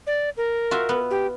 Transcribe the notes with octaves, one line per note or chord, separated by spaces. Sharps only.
D5
A#4
F4 F#4 E5
B3
G4